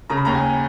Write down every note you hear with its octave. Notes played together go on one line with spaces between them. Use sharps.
C#3 A#5
B5
D#2 A#5
G#5